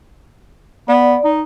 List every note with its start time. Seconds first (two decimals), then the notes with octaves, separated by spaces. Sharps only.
0.88 B3 D5
1.24 D#4